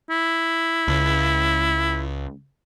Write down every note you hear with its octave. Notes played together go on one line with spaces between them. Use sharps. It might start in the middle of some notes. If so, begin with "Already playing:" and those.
E4
C#2